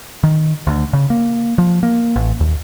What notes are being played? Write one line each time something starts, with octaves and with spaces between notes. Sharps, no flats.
D#3
D2
C#3
A#3
F3
A#3
A1
D#2